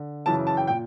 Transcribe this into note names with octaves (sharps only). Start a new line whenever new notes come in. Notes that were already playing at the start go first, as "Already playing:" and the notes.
Already playing: D3
F#2 C#3 E3 A5
A5
G5
A#2 G5